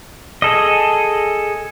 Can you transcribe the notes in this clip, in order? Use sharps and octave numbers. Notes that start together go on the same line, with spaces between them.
G#4 A4 D#5